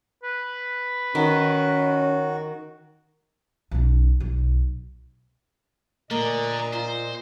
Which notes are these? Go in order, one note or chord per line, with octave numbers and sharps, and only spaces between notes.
B4
D#3 C#4 F#4
B1 C#4
B1
A#2 D3 A#3 D#5 A#5
F4 C5